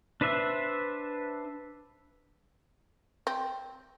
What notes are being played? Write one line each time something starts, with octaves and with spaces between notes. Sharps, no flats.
D4 B4 C5 E5
C4